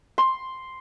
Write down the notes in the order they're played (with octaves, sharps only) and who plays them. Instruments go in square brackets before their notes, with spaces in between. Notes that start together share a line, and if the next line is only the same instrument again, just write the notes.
[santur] C6